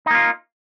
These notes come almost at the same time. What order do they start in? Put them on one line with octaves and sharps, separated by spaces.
D#4 A#3 F4